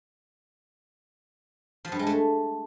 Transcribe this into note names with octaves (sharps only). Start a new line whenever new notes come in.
F3
G2
G#3
A3